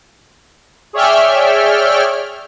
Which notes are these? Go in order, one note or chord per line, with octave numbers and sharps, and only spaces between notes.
G#4 C#5 D5 E5 G5 F6